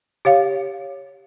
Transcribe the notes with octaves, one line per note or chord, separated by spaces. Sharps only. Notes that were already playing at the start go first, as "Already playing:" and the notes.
G4 C#5 F5